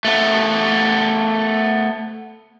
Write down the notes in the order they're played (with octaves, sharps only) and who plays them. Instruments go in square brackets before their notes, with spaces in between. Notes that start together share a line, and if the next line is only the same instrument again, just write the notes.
[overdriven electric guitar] A3 B3